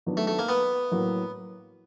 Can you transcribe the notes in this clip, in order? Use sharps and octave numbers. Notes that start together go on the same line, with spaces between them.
D#3 F#3 B3 D4 F4
A3
A3
A#3
B3
A2 F#3 A#3